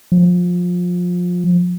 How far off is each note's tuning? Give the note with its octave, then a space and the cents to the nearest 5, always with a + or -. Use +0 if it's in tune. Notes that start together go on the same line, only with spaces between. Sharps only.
F3 +25